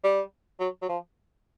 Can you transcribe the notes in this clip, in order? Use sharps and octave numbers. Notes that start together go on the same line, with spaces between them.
G3
F#3
F#3
F3